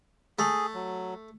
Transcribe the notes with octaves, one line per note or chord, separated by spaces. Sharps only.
A3 G#4
F#3